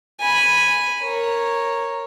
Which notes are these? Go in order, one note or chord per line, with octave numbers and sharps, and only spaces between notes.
G#5 B5
A#4 C#5